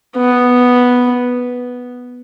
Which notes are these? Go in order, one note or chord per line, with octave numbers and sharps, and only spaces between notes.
B3